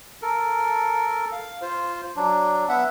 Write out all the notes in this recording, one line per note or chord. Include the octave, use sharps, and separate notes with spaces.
A4 A#4
F5
F4 C5
F#3 D4
B3 E5 F#5